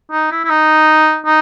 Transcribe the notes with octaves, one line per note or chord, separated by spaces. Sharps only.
D#4
E4
E4
D#4
D#4